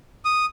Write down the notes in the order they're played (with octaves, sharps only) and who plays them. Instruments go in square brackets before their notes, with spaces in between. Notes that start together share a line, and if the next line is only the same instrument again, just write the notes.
[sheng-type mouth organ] D#6